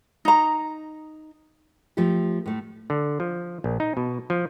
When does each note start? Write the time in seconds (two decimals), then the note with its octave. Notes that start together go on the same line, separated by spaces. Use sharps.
0.25 D#4 A#5
1.97 F3 A3 F4 G4
2.46 A2 A3
2.90 D3
3.20 F3
3.64 A#1
3.80 D#4
3.97 B2
4.30 F3